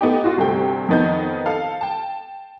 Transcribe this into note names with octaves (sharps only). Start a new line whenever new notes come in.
A3 B3 D#4 G4
F4 F#4
D2 G2 C3 A3 G5
F2 D#3 B3 D#4 G6
A4 F5
G5 A5